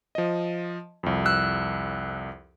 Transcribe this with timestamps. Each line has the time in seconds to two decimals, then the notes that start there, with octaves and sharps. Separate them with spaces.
0.15 F3 D#5
1.03 C2 F2
1.26 E6 F#6